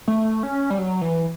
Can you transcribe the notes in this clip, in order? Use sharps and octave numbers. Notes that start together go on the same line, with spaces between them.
A3
C#4
G3
F#3
E3